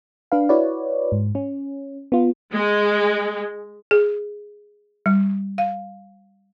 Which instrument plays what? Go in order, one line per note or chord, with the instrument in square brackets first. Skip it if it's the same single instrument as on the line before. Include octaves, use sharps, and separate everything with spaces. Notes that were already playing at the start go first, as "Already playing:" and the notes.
[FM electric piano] D4 B4 F5
E4 F#4 B4 C#5 D5
G#2
C#4
B3 F4
[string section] G#3
[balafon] G#4
G3
F5